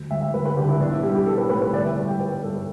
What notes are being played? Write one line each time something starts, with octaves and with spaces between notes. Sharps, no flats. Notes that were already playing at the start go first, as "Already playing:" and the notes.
Already playing: D2
D2 E5
E5
D2 B4
B4
D3 G4
E4
B1 D4
E4
G3 G4
G4
B1 A4
B4
A2 B4
B4
G1 D5
E5
G3
G5
G3 B4
G2 A4